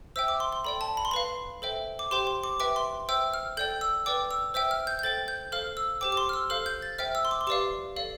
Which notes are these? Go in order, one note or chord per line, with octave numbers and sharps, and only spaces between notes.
C5 E5 G5 E6
D6
C6
C6
A4 D5 G5 B5
A5
B5
C6
B4 F5 B5
A4 C5 E5 G5
D6
G4 C5 G5 C6
C6
D6
B4 E5 G5 D6
C6
C5 E5 G5 E6
F6
A4 D5 G5 G6
E6
B4 D5 G5 D6
E6
C5 E5 G5 E6
F6
G6
G6
A4 C5 G5 A6
G6
A4 C5 F5 F6
E6
G4 C5 G5 D6
D6
C6
F6
E6
A4 C5 F5 F6
G6
A6
C5 E5 G5 F6
E6
C6
D6
C6
G4 B4 D5 F5 D6
A4 D5 F5